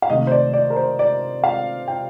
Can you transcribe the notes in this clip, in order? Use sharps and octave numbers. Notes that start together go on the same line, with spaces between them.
F5
C3 D#3 A3 D#5
C5
D5
D5
A#4
C5
D5
F5
G5